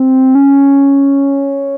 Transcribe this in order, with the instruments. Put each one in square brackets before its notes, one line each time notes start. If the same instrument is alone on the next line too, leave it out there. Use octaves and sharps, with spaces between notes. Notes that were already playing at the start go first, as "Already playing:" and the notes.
Already playing: [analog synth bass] C4
C#4